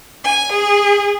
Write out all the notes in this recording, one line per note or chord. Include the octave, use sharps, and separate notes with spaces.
G#5
G#4